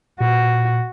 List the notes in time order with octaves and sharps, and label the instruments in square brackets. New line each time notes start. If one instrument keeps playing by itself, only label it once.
[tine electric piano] A#2 [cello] F#4